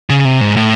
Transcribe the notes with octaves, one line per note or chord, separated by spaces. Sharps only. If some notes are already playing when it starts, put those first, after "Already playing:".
C#3
C3
G#2
A2